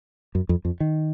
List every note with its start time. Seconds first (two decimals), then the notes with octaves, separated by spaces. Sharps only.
0.35 F#2
0.49 F2
0.65 F2
0.80 D#3